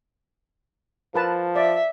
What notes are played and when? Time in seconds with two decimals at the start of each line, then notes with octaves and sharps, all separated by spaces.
1.14 F3 A#4 B4 A5
1.56 D5 E5